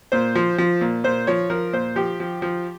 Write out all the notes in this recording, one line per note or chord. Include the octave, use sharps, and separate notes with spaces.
A#2 C5
F3
F3
A#2
A#2 C5
F3 C#5
F3 A#4
A#2 C5
F3 G4
F3
F3